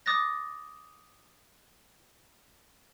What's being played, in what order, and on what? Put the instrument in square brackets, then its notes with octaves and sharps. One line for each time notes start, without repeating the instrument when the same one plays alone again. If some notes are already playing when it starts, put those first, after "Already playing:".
[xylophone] D6 D#6 F#6 A6 A#6